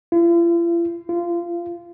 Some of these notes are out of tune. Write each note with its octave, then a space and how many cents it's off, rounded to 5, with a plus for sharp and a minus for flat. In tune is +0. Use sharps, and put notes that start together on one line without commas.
F4 -45
F4 -20